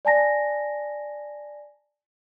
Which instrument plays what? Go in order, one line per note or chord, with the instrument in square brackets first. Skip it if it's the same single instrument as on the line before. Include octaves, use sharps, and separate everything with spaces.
[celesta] D5 G#5 A5 A#6